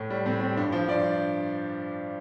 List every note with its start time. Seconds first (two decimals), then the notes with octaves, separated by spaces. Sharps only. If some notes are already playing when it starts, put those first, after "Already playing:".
Already playing: A2
0.10 G3
0.26 A2 C4
0.41 G3 C4
0.57 G2 D4
0.72 F3 C5
0.88 G2 D5